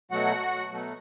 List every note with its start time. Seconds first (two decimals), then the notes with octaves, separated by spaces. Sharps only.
0.11 B2 F#3 A3 F#4 F#5
0.71 B2 F#3 A3